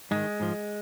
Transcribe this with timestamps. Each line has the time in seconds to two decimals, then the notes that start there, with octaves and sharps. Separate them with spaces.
0.11 G#2 D#3 G#3
0.40 G#2 F3